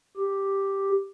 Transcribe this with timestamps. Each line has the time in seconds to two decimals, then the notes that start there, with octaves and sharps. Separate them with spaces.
0.17 G4